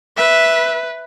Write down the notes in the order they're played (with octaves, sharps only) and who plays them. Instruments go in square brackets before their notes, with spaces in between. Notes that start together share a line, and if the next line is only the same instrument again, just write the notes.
[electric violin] B4 [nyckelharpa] E5